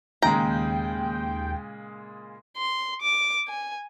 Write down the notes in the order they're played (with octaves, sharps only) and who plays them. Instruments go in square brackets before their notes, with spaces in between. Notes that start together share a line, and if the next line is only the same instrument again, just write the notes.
[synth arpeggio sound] D#2 G5 [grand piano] A#2 C#3 G#3 [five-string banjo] A#5
[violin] C6
D6
G#5